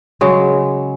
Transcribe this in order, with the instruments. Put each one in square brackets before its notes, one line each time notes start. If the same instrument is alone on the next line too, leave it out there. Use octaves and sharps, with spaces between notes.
[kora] C#3 F#3 G#3